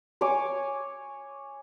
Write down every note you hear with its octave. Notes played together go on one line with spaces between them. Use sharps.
C#5 G#5 C#6 D6